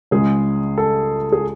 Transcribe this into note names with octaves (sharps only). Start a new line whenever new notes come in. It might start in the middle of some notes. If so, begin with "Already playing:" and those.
C#2 C#3 G#3 G#4
A4
G#4